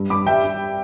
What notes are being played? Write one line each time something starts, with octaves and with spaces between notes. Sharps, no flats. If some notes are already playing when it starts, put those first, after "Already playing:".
Already playing: G2 G3
G2 B5 D6
G3 E5 G5
G3